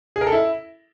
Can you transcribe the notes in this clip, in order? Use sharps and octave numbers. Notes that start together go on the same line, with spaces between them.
G#4
A#4
A4
E4